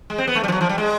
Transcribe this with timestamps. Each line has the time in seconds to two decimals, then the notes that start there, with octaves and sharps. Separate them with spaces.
0.10 G#3
0.18 C4
0.27 B3
0.35 A3
0.44 G3
0.48 F3
0.52 F#3
0.61 F3
0.69 G3
0.78 G#3